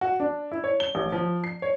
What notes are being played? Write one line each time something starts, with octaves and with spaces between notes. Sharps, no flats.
F#4
D4
E4
C#5
G7
A1
F3
C7
C#5